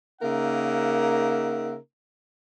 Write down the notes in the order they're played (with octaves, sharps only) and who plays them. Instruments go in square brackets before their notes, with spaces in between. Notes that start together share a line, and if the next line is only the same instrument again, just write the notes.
[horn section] C#3 A#3 D#4 A#4 E5 F#5